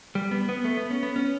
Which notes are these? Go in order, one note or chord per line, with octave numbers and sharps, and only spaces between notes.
G3
B3
B3
A3
B3
C#4
B3
C#4